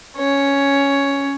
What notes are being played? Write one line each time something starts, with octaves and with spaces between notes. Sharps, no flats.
C#4 C#5